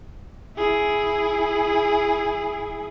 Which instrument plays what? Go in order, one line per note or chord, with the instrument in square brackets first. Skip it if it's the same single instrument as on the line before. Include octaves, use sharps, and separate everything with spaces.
[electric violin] E4 G#4